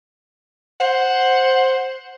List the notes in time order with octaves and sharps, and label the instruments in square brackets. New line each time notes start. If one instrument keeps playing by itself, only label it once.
[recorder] C5 [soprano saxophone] F#5